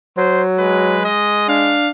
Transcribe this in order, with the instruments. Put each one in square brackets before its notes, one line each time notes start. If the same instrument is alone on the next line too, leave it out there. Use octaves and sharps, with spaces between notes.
[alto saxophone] F#3 [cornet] C5
[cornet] G#3 [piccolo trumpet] B4
[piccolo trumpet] D#5
[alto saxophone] D4 [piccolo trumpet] F5